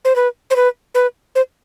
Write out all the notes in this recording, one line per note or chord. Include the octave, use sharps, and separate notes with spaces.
C5
B4
C5
B4
B4
C5